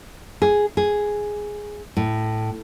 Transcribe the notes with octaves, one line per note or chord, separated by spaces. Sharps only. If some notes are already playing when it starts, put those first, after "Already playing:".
G#4
G#4
A2